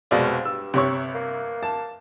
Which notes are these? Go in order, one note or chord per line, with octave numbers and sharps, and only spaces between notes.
F1 B2 G#3 C4 D5 F5
G2 E6
G1 C3 C#5 C#6
A#3
A5